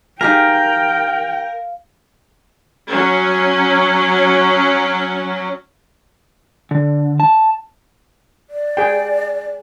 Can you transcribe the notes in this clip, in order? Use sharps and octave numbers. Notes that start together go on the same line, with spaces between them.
D#4 G4 G#4 A#4 F5 G5
F#3 C#4
D3
A5
D5
G#4 G5